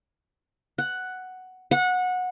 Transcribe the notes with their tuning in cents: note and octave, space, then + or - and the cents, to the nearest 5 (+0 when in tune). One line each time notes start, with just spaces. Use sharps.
F#5 +5
F#5 -20